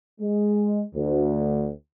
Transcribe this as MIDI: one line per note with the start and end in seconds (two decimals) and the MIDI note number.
0.20 0.82 56
0.95 1.69 38